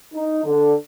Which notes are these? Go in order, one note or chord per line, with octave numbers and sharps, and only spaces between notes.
D#4
D3